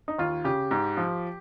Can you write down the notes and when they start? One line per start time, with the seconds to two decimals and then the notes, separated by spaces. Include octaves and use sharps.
0.08 D#4
0.18 D#2 F4
0.44 C#3 G4
0.71 G#2
0.97 F3